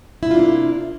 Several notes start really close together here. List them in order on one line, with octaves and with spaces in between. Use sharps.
E4 C3 F4 D4 A#3